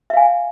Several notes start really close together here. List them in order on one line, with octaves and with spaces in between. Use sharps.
E5 F5 G#5